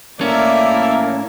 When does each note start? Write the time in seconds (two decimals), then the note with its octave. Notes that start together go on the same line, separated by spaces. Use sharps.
0.21 A2 A#3 C#4 E4 A4 A#4 D5 E5